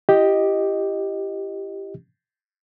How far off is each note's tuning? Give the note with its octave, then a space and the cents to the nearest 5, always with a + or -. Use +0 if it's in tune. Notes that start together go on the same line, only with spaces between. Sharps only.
E4 +40 G4 +0 D#5 +0